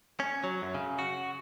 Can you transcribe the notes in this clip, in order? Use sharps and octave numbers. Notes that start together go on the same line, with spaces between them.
C#4
F#3
F#2
C#3
F#4